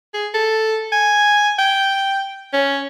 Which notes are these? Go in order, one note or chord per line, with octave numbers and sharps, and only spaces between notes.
G#4
A4
G#5
G5
C#4